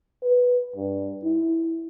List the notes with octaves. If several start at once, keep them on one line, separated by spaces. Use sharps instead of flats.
B4
G2
E4